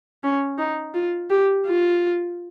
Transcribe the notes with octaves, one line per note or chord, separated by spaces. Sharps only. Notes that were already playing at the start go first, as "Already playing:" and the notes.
C#4
D#4
F4
G4
F4